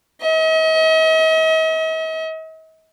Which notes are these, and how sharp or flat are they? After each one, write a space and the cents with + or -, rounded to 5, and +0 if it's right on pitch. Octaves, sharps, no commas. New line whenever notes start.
D#5 +45